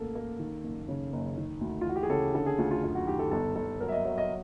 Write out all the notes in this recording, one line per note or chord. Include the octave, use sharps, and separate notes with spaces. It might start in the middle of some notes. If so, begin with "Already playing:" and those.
Already playing: A1 A#3 A4
A#3
D#3
F#1
C#3
F#1
D#3
D2
F4
E3 F#4
G4
G#4
C#3 A4
D3 A4
G#4
D2 F4
F4
F#2 F4
F#4
D#3 G4
A4
G1 A4
G1 A4
F#3 A#4
E5
D#5
F#3 E5
D#5